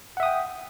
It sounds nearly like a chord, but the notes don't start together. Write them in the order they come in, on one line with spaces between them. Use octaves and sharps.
F#5 E5 D#6 G5